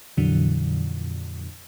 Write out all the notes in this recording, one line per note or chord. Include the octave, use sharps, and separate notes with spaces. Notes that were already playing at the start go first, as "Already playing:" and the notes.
F2 A#2 D3 E3 F#3